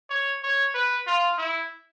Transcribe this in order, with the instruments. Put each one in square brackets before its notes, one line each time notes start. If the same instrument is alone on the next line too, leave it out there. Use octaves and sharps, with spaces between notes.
[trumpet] C#5
C#5
B4
F4
E4